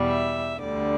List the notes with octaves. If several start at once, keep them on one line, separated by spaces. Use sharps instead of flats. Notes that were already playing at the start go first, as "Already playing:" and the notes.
Already playing: E2 B2 G3
E5
D2 D3 G3 D5